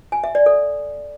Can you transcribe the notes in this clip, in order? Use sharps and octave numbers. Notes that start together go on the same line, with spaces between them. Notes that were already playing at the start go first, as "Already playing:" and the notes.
G#5
E5
D5
A4